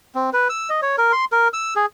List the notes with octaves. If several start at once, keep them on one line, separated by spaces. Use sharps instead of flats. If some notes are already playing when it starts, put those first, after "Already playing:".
C4
B4
E6
D#5
C#5
A#4
C6
A#4
E6
G#4